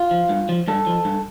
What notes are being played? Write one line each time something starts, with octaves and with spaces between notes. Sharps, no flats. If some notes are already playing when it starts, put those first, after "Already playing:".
Already playing: F4
F3
G2
F3
G2 A4
F3
G2